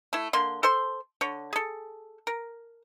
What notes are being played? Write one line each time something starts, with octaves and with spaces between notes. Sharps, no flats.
A3 E4
D3 A#3 C6
A4 C5 C6
D3 C#5
G#4 A4
A#4